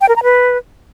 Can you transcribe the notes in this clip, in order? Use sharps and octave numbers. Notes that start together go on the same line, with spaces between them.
G5
A#4
A#5
B4